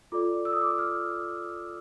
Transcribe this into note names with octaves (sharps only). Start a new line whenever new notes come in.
F4 A4 D5 D6
E6
D#6
D6
D#6
F6